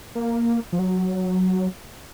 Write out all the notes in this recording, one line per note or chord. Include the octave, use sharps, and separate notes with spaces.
A#3
F3
F#3